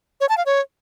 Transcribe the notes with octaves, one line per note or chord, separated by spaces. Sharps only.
C#5
A5
F5
C#5